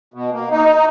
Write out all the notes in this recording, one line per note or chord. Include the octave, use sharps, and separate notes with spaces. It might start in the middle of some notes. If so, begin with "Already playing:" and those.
B2
A#3
D#4